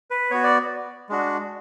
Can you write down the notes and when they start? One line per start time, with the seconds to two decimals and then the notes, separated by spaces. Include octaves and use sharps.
0.11 B4
0.31 B3 F#4 C#5
0.43 D5
1.09 G#3 D4 F#4